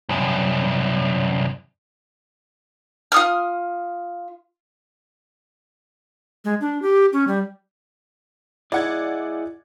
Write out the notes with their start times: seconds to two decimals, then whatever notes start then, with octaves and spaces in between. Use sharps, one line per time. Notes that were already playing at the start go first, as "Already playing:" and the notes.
0.09 C2 F#2
3.12 F4 D#6 F6
6.45 G#3
6.61 D4
6.82 G4
7.13 C#4
7.28 G3
8.72 E4 G#4 D5 D#5 F#5 G#6